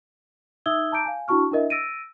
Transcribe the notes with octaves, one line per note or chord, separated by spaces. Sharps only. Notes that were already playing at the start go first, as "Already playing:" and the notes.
D#4 E5 D#6 E6 G#6 G7
A5 A#5 D6 G6 D7
F5 G#5
D4 E4 F#4 A5 C#6 F6
D4 E4 A#4 D#5 E5
E6 A6 A#6 D7 D#7